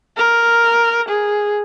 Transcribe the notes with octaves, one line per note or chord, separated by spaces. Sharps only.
A#4
G#4